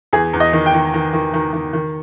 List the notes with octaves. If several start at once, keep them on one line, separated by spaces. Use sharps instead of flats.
E2 G#4
E2
D#5
D#3
G5
D#3
D#3
D#3
D#3
D#3
D#3